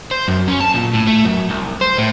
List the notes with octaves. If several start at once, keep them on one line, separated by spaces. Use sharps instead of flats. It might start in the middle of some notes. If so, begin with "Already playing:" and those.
C5
F#2
C#4
A5
A#2
A2
A3
F#2
C2
C5
A2